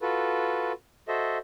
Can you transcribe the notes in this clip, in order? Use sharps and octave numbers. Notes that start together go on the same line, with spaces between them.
F4 F#4 A4 B4
F#4 A4 C5 D#5 E5